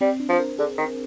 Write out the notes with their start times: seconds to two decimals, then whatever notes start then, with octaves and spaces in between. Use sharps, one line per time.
0.01 G3 C4
0.20 D4
0.29 F3
0.33 C5
0.40 A#4
0.59 D3 G#4
0.78 D#3